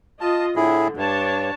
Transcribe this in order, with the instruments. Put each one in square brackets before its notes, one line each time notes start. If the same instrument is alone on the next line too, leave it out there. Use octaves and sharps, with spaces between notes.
[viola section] F4 D#5 [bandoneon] A5
[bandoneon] A2 E4 G#4 [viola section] D3
[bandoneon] G2 [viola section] D4 C#5 A5